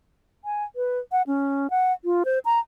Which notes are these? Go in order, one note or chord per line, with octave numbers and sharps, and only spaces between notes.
G#5
B4
F#5
C#4
F#5
F4
C5
A#5